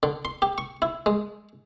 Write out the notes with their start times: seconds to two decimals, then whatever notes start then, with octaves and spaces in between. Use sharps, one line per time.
0.03 D3
0.25 C6
0.42 G4
0.58 C#6
0.82 E4
1.06 G#3